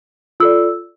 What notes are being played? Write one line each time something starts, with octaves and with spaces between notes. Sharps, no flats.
F4 A4 D5 E6